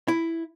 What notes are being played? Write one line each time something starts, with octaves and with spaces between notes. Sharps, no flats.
E4